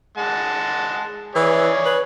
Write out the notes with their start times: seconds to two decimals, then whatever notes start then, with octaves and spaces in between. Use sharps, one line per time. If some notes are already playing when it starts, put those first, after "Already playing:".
0.18 G#3 F#5 A5
1.35 E3 G#4 C#5 D5
1.85 B4